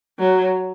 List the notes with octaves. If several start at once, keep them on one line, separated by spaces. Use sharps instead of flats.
F#3